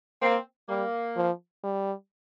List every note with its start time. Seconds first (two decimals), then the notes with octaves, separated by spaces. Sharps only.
0.22 A#3 C4
0.69 G3 A#3
1.16 F3
1.64 G3